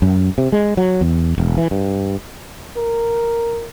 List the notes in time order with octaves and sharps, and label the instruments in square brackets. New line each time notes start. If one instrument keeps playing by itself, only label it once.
[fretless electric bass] F#2
C3
G#3
F#3
E2
E1
E3
G2
[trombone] A#4